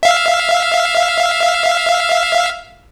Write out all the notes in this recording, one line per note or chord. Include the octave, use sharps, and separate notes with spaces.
E5 F5